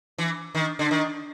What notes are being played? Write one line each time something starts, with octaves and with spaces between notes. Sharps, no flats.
E3
D#3
D3
D#3